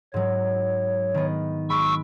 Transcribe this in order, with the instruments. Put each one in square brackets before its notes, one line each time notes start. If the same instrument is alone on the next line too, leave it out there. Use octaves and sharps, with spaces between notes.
[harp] G#2 F#3 [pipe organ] C#5
[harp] D#3 B3
[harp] G#3 B5 D7 [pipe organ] C#6 E6